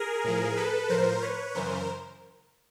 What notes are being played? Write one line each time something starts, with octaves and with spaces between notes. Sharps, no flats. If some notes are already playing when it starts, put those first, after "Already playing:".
Already playing: G#4 A#4
A2 F3
A4 B4
A2 F3 A#4 C5
B4 C#5
F#2 C#3 E3 A#4 C5